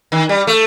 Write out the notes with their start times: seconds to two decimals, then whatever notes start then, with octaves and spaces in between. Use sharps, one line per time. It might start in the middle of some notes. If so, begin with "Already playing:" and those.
0.12 D#3
0.29 G3
0.47 A3